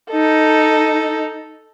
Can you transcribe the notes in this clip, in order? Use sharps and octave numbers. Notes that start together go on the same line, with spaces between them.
D#4 A4